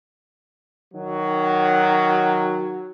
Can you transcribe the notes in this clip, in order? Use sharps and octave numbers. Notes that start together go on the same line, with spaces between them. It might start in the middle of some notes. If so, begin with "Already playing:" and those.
D#3 F#3